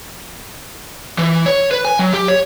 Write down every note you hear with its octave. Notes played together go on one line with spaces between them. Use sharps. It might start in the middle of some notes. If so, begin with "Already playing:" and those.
E3
C#5
B4
G#5
F#3
G4
C#5